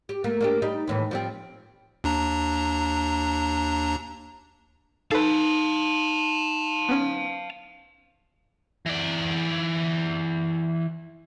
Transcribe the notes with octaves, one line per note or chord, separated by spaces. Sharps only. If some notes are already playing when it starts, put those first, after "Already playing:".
G4
A3 A#3
A#3 D4 G4
G3 D#4
D#2 A2 E3
F3 G3 C4
D#2 D4 A#5
D#4 A4 B4 F5 A5
B3 C#4
E3 D5